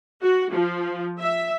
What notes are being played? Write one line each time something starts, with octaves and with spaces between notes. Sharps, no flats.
F#4
F3
E5